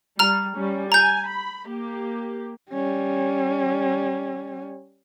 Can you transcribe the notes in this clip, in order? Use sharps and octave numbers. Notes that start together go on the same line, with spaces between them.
G3 A#5 F6
G3 C#4
G#5 A#5 G6
B5
A#3 G4
G3 C#4